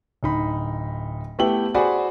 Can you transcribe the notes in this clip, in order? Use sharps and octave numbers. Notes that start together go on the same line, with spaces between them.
D1 D#4 B5
A3 B3 E4 G4 G5 F#7
F#4 G#4 C5 D5 G#5 B5